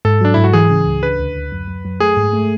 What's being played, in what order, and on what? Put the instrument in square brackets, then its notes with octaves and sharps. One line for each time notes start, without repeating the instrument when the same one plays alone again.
[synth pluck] G#2 [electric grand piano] A4
[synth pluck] F#3 [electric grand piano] D4
[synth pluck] G#2 [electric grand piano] E4
[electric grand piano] F#4
[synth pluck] E3 [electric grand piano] G#4
[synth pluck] C#3
C#2
[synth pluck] D3 [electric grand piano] B4
[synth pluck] D2
D2
F#2
F#2
F#2
[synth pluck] A3 [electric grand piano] G#4
[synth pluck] G#2
A3